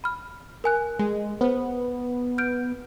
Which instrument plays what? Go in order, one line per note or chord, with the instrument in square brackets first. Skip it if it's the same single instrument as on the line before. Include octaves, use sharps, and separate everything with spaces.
[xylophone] B5 F6
A#4 G#5 F#6
[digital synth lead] G#3
[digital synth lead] B3 [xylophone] C5
[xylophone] F6 G6 D7